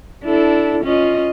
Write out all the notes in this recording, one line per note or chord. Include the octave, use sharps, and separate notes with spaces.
D4 E4 A4
C#4 F4 D#5